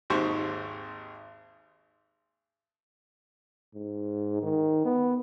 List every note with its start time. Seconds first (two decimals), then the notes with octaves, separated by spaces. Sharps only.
0.10 G#1 D#2 G#2 G4 C5 C#6
3.74 G#2
4.43 D#3
4.85 B3